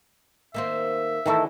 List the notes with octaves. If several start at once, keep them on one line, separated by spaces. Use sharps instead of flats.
D#3 A#3 C4 E5
D#3 E3 A3 D#4 E4 A4